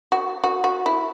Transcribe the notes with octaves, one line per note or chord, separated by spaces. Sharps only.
F#4
F#4
F#4
E4